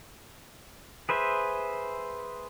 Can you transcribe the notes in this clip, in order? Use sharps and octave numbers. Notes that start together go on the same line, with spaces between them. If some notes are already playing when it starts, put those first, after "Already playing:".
G#4 B4 C5 E5